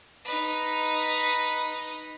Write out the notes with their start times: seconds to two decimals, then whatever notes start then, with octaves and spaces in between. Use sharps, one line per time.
0.25 D#4 B4